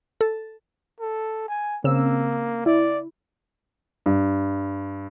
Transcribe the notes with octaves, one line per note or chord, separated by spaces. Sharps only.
A4
A4
G#5
C#3 A#3 C4 E6
E4 D5
G2